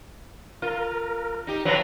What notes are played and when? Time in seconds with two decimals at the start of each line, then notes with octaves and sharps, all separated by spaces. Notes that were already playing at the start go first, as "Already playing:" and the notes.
0.62 F4 A#4
1.47 D#4 G4
1.65 A2 F3 F#3 B4 A#5 A#6